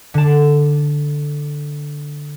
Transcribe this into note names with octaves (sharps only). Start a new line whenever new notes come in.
D3 A5